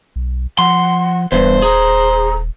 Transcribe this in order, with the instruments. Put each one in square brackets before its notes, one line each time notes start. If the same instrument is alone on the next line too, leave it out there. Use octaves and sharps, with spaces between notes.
[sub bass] B1
[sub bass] F3 [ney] F#5 [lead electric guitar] C6
[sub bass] D#1 [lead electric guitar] E2 G2 [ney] B4 [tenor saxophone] C5
[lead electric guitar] G#4 [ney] A#5